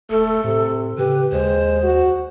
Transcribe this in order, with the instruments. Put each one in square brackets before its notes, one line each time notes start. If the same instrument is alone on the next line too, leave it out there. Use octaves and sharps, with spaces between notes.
[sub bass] D#1 [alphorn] A3 [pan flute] A4
[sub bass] A2 [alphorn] C3
[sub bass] C#3 [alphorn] G4 [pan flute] B4
[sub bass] D#2 [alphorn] G#3 [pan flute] C5
[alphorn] F#4